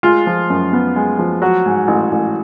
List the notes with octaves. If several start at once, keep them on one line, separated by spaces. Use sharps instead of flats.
G#3 F4
F3
F#2
B3
G#3
F3
F#3 F#4
G#2
A1
A1